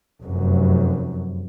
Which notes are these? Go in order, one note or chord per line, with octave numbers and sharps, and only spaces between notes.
F1 F#2